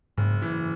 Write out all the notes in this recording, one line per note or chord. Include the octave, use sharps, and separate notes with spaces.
F#1 G#2
E3